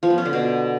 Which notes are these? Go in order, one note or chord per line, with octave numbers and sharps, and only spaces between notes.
F3
B3
C#4
D3
B2